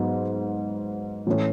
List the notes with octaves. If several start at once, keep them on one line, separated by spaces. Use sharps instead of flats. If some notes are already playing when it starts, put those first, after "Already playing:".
Already playing: G#2 F#3 B3
A2 E3 A3 C#4